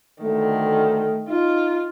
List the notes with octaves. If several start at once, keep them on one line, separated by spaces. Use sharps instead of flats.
D2 D#3 A3
D#4 F4